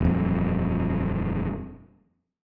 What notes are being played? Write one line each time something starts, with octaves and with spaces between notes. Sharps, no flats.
D#1 F2